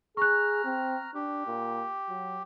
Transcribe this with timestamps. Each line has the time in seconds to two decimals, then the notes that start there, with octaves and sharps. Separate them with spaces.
0.17 G#4 A#5 C#6 F6 F#6
0.65 C4
1.15 D4 G4
1.47 A#2
2.09 F#3